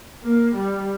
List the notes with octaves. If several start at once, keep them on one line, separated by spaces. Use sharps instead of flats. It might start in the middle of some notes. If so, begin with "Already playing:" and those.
A#3
G3